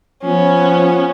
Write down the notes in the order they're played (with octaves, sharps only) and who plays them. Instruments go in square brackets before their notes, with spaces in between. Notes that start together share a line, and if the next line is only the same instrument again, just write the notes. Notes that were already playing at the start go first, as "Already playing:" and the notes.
[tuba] F3 [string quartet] B3 C#4